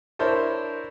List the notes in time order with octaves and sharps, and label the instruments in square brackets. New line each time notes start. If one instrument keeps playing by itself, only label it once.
[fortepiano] D4 E4 A#4 C5 C#5 A5